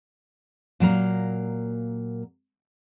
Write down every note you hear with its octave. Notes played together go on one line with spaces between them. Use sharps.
A#2 F#3 A#3 A#5